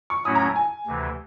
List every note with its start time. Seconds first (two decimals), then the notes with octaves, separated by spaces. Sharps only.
0.10 C#6
0.24 A2 F#3 A3 C#4 E4 D#6
0.35 A#5
0.45 A5
0.56 G#5
0.87 D2 C3 E3